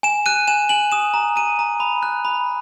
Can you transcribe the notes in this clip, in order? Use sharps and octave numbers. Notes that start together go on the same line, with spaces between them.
G#5 E7
F#6 D#7
G#5 E7
G#5 F#7
D#6 E7
A#5
A#5 D#7
A#5
B5
F#6
B5